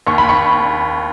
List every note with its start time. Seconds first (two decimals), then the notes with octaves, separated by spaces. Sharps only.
0.07 D#2 C#6
0.18 B5
0.29 C#6